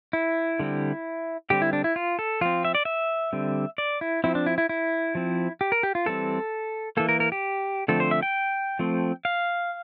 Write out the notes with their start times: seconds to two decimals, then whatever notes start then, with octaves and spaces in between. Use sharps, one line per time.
0.13 E4
0.60 D3 G3 C4
1.50 D3 G3 C4 G4
1.62 E4
1.73 D4
1.84 E4
1.96 F4
2.19 A4
2.41 F3 C4 F4
2.65 E5
2.75 D5
2.85 E5
3.33 D3 G3 C4
3.78 D5
4.01 E4
4.24 F3 C4 E4
4.35 D4
4.46 E4
4.58 E4
4.69 E4
5.15 F3 C4
5.61 G4
5.72 A#4
5.83 G4
5.95 F4
6.06 E3 G3 C4 A4
6.97 E3 A#3 A4
7.09 A#4
7.20 A#4
7.32 G4
7.88 D3 F3 A3 C4 A4
8.00 C5
8.11 E5
8.22 G5
8.79 F3 A3 C4
9.25 F5